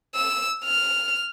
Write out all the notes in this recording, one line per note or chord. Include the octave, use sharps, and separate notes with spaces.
E6
F6